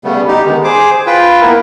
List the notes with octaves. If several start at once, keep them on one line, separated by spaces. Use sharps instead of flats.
C#3 G3 A3 B3
D#4 G4
D3 D#3 G#3 B3
G#4 C5 D6
F4 B4 G5
A#3 B3 E4 A#4